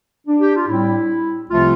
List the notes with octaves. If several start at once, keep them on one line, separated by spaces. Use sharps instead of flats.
D4
G4
F4
A2 G3 C4 E4
C2 C3 F3 A3 C4 F4